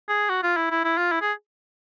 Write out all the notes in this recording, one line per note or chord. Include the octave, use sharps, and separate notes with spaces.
G#4
F#4
F4
E4
E4
E4
F4
E4
G#4